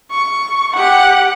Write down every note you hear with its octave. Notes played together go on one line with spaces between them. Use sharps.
C#6
G4 F#5